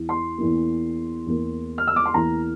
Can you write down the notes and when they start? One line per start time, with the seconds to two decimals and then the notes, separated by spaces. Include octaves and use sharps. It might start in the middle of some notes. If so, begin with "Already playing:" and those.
Already playing: E2 E3
0.09 C6
0.38 E2 E3 A#3
1.27 E2 E3 A#3
1.78 F6
1.88 E6
1.96 D6
2.06 C6
2.14 E2 E3 A#3 A#5